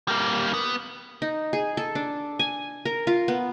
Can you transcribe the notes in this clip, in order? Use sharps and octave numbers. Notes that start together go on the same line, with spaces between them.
G3 A#3
B3
D#4
G#4
A4
D4
G#5
A#4
F4
B3